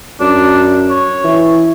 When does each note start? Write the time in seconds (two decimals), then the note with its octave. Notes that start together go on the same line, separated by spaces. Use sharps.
0.20 F#2 D4
0.90 C#5
1.24 E3